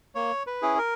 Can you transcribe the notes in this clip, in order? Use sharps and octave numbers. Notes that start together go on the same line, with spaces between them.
A#3 C#5
B4
C#4 E4 G#4
A#4